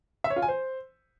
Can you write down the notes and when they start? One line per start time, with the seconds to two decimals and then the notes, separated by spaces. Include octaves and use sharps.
0.24 E5
0.30 C#5
0.36 F4
0.42 G#5
0.48 C5